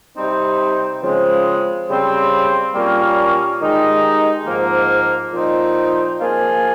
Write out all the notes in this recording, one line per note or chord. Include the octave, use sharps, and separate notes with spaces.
C3 G3 C4 D#4
C#3 F3 G#3 C4
C#3 G3 C4
A#2 G3 A#3 C#4
D#3 G#3 D#4 G4
G#2 F3 A#3
A#2 F3 C4 D#4
F3 A#3 F4 G#4